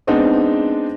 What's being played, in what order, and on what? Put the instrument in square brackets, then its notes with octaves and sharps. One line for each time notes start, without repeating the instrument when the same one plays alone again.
[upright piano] G#3 B3 C4 D4 D#4